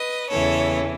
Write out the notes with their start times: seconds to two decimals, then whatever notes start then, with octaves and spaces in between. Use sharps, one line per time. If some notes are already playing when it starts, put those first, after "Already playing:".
Already playing: B4 D#5
0.30 E2 C#3 E3 A4 C#5